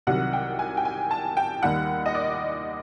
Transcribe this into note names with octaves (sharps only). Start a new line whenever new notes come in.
C2 C3 D#3 F#3 F#5
G5
G#5
G5
G#5
A5
G5
D#2 D#3 G3 F#5
D#5
D5